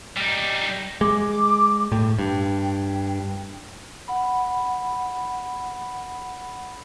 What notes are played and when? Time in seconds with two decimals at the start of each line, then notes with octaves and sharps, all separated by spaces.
0.17 G3 D#4
1.01 G#3 D6
1.92 A2 G5
2.19 G2
4.08 F#5 B5